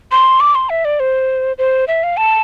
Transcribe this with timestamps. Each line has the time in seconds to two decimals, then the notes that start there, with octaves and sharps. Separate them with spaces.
0.12 C6
0.40 D6
0.55 C6
0.70 E5
0.85 D5
1.00 C5
1.58 C5
1.88 E5
2.03 F5
2.17 A5